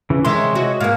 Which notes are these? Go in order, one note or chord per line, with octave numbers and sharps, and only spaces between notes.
C#3 E3
C3 D#3 G#3 C#5 E5 C6
F#4 C#5 D#5
G#2 A#3 F5